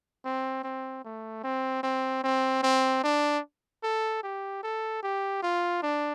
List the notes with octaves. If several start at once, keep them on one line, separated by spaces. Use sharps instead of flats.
C4
C4
A3
C4
C4
C4
C4
D4
A4
G4
A4
G4
F4
D4